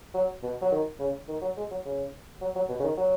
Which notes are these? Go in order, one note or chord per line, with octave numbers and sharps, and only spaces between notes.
F#3
B2
F#3
D#3
C#3
D#3
F#3
G#3
F#3
C#3
F#3
F#3
B2
C#3
D#3
F#3